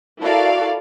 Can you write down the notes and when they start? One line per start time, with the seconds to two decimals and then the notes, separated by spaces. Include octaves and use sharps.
0.21 E4 F#4 A4 A#4 D5 F5